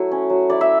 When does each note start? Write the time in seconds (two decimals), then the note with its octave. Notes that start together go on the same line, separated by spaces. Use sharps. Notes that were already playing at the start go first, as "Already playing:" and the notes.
Already playing: F#3 A3 E4
0.12 C#4
0.30 F#3
0.50 E4 D5
0.61 E5